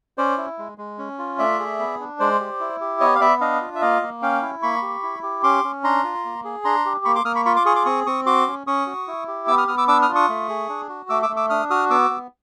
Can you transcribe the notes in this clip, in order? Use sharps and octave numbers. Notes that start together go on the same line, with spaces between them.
C#4 C5 D5
E4
G#3
G#3
C#4
F4
A3 D5 E5
G#4
B3
D4
G#3 C5 D5
G4
E4
G4
B3 C#5 D#5
F5
B3 D5 E5
D4 D#5 F5
F4
E5
A#3 D#5 F5
A#3
C#4 F5 G5
E4
A#3 B5 C#6
G4
E4
G4
C#4 C6 D6
C#4
D4 A#5 C6
F4
A#3
G#4
D4 A#5 C6
G4
A#3 B5 C#6
C6 D6
A#3 D#6 F6
B5 C#6
F4 B5 C#6
C6 D6
G#4 C#6 D#6
C6 D6
C4 C#6 D#6
C4 C#6 D#6
F#4 C6 D6
C#4
C#4 C#6 D#6
F#4
E4
G4
B3 D6 E6
D#6 F6
B3 D#6 F6
D6 E6
D4 D6 E6
D#6 F6
F4
C#6 D#6
A3
G#4
D4
F#4
A3 D6 E6
D6 E6
A3
D6 E6
D4 D#6 F6
F#4 D#6 F6
B3 D6 E6
B3